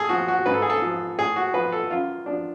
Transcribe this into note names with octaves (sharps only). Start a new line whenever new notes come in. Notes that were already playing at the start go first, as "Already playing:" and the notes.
Already playing: A2 G#4 A4
F3 F#4
F#4
G#2 B4
A4
G#4
A4
F3
A2 G#4
F#4
F3 B4
A4
F#2 F4
F3 D4